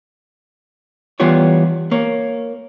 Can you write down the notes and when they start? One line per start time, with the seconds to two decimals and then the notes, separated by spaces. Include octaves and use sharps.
1.20 E3 G3 B3 F4 G4 C#5
1.91 A#3 C#5